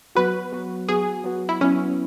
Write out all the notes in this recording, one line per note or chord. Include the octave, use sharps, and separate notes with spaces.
F#3 B3 F#4 B4
F#3 B3 F#4
F#3 B3 F#4 G#4
F#3 B3 F#4
E4
F#3 B3 C#4 E4